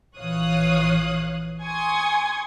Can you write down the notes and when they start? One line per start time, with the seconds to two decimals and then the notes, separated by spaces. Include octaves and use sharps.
0.18 A#1 E3 C#5 F5 D#6 F#6
1.62 G#5 C6 C#6 D#6 G#6